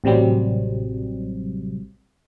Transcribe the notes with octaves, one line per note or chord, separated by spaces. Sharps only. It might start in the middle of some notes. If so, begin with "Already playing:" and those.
A1 C3 F#3 G3 C4